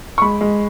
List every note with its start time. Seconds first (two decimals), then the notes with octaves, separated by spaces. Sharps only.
0.18 C#6
0.21 G#3 B5
0.41 G#3